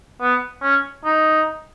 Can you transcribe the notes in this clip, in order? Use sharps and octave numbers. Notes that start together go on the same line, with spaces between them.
B3
C#4
D#4